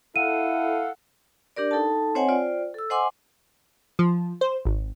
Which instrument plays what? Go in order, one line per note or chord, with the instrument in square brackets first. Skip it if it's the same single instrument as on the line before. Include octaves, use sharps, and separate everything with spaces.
[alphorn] E4 [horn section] A4 F5 [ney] F#5 [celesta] D#7
[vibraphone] D4 G4 A#4 D5
D#4 A4 G5 A5
C4 C5 C#5 D#5 F#5 G#5
F4 C5 D5 G5
A4 E6
C5 D#5 F#5 G#5 C6 D6
[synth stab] F3
C5
G#1